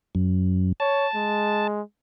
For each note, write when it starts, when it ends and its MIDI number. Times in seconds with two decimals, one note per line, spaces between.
0.15 0.73 42
0.80 1.07 73
0.80 1.67 81
1.15 1.81 56